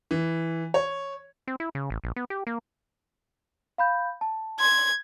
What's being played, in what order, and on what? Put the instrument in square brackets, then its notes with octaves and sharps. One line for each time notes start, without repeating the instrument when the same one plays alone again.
[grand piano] E3
C#5
[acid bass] C4
E4
C#3
A1
A#1
B3
G4
A#3
[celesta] F5 B5 G6
A5
[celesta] C6 [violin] G#6